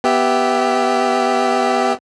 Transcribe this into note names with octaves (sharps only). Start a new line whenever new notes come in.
B3 G4 E5